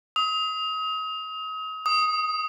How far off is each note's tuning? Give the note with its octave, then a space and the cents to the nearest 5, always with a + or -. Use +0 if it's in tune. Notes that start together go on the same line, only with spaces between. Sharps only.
D#6 +35
D#6 +10